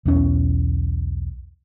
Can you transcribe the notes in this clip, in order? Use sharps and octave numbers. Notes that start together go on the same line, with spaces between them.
B1 E2 C#4